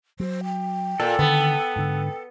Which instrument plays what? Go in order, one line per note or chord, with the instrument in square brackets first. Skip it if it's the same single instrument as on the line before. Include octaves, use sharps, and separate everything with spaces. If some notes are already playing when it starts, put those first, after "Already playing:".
[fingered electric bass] F#3 [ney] C5
[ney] G5
[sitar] A#2 [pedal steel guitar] A4
[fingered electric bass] D3 D#3 [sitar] B3
[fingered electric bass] G#2 D3